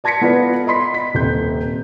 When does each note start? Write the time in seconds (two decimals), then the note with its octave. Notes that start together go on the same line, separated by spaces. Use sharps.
0.04 D5 A5 G#6 A#6 B6 C#7
0.21 B3 F4 A4 B4 D5
0.67 D#5 B5 C6 B6
0.94 B6
1.14 D#1 C3 G6